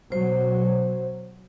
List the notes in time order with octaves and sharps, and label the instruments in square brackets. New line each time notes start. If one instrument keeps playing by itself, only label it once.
[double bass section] B2 F#3 [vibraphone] C5